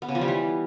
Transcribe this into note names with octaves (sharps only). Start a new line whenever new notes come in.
B3
C#3
F3
G3
E3